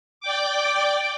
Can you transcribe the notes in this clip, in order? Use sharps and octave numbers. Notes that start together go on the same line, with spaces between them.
D5 G5 D6